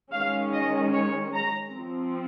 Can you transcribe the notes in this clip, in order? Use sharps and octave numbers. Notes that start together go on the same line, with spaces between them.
D#3 G#3 C#4 F5
D#5
C#5
A#5
F3 C4